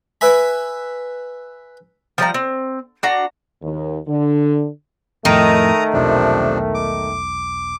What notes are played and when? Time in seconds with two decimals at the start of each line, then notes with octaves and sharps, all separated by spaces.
0.21 B4 E5 G#5 B5
2.18 F3 G3 D#5 A#5
2.34 C4
3.03 D4 F#4 A#5
3.62 D#2
4.08 D3
5.25 F2 A2 D#3 A3 A#5 D#6
5.93 E1 B1 C3 F3 D4
6.74 D6